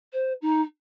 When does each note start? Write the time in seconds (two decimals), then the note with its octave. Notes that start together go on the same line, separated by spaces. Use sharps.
0.12 C5
0.41 D#4